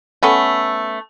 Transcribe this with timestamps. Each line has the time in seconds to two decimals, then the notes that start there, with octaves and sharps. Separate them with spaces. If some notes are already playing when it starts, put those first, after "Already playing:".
0.23 A3 B3 C#4